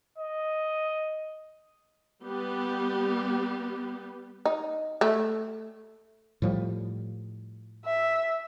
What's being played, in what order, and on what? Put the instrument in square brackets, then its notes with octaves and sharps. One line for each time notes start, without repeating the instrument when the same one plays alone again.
[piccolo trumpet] D#5
[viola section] G3 B3 G4
[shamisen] D#4
A3
[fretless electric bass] A2 F3 G3
[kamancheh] E5